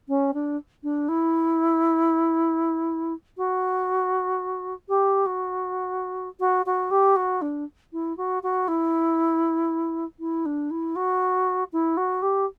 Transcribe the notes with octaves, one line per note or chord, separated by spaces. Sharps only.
C#4
D4
D4
E4
F#4
G4
F#4
F#4
F#4
G4
F#4
D4
E4
F#4
F#4
E4
E4
D4
E4
F#4
E4
F#4
G4